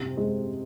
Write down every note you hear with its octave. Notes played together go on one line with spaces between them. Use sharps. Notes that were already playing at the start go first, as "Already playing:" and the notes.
Already playing: C3
G#3